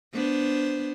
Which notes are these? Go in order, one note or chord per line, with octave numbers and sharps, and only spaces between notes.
B3 D4 C5